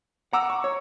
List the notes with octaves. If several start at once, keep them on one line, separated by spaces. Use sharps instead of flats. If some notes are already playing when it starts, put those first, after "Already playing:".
F#5 A#5 D6 E6
C#6
C#5